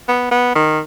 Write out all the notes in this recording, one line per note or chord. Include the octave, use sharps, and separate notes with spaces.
B3
B3
D#3